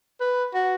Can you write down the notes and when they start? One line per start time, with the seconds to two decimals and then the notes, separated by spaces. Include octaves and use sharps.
0.20 B4
0.54 F#4